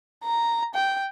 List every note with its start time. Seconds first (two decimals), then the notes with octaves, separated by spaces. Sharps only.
0.24 A#5
0.75 G5